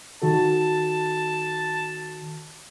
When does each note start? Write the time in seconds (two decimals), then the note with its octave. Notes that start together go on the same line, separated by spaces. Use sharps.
0.22 D#3 F#4 A4 A5